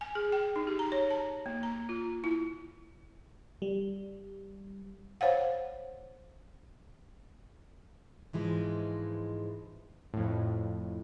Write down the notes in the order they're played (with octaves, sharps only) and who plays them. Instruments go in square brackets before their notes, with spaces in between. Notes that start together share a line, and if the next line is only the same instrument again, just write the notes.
[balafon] G#5
G#4
G5
D#4
G4
A#5
C#5
A5
A#3
A#5
F4
E4
[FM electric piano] G3
[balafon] C5 C#5 F5 F#5
[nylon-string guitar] G#2 E3 F3 G#3
[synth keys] F2 A2